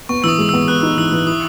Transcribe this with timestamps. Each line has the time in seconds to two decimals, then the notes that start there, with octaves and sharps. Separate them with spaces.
0.09 B3 C#6
0.24 E3 D#6 E6
0.39 G#3
0.49 B3 E6
0.68 B3 F#6
0.83 D#4
0.97 E3 E6
1.12 E3
1.27 E4 D#6